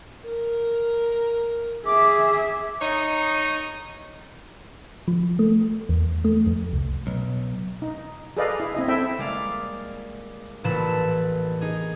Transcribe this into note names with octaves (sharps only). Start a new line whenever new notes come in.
A#4
G#4 E5 D6
D#4 C#5 D#5
F3
A3
E2
A3
F2
C2
B1
D#4
G#4 A4 B4 D5 D#5 F5
E4
C4 E4 D#5
C4 E4 A4 E5 G5
G3 G#3 A#3 D5 F5
A1 A#2 E3 A5 B5 E7
D#4 G#4